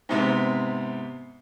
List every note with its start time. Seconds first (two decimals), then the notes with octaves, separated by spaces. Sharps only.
0.09 G#2 C3 B3